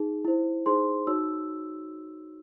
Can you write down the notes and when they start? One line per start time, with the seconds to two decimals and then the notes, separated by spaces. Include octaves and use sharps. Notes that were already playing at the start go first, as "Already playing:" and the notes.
Already playing: D#4 G#4
0.25 E4 C5
0.66 D#4 G#4 C5 C6
1.07 D#4 F#4 C#5 E6